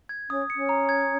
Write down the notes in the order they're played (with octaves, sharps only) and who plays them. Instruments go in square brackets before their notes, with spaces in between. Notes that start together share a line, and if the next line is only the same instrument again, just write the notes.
[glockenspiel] G#6
[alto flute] C#4 [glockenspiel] D#6
[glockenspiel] C#7
[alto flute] C#4
[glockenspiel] A#5
G#6